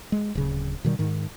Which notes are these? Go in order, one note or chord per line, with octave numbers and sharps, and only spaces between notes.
G#3
D1 C#3
B2 D#3 G3
G#2 D#3